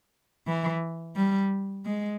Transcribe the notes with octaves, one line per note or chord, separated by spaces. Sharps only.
E3
G3
G#3